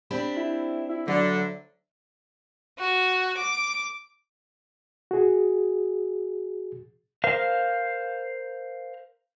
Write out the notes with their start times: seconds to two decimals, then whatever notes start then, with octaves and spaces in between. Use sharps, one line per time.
0.11 C4 D4 G4 B5
0.37 E4
0.89 E4
1.08 D2 D3 F#3
2.78 F#4
3.37 D6
5.11 F#4 G#4
7.24 A#4 C5 F5